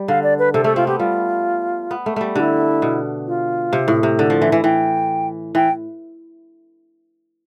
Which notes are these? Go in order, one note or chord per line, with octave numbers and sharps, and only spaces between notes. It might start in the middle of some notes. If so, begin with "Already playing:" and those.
Already playing: G3
D3 F5
D5
B4
C3 A4
A3 A4
C4 F4
B3 G4
G3 F4
B3
A3
G3 A3
D3 E4 G4
B2
F4
C3
A2
C3
D3
F3
E3 E5
E3
E3 G5
E3 G5